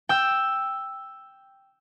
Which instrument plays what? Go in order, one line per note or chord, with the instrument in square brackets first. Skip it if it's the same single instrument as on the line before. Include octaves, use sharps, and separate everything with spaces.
[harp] G5 E6